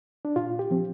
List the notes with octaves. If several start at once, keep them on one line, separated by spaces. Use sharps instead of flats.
D4
A#2 F4
G4
F3 C4